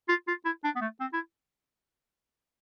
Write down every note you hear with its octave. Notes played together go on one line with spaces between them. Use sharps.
F4
F4
E4
D4
B3
A3
C4
E4